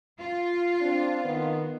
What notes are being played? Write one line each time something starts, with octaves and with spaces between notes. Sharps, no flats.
F4
C4 D4
D#3 B3